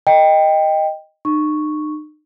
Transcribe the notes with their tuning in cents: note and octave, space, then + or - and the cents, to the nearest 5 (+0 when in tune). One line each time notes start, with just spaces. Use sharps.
D#5 +0 G5 +10
D#4 -40 C#6 +0